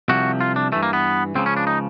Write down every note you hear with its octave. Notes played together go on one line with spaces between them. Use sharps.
C2 C3 F3 F#4
F4
D4
G2 E3 A3
A#3
B3
C#2 C#3 F3 C4
C#4
D4
D#4